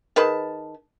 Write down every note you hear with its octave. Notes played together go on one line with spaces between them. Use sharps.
D#3 G#4 B4 A5